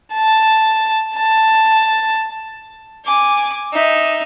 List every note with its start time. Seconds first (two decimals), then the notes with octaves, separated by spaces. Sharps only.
0.14 A5
1.16 A5
3.04 G#5 D6
3.73 D#4 E5